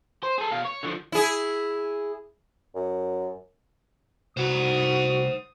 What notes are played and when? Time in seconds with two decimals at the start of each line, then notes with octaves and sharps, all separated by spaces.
0.23 C5
0.38 G#4 A4
0.52 B2 F5
0.65 C#5
0.83 D3 F3
1.12 E4 G#4
2.75 F#2
4.37 C2 F#4 C5 F#5 D#6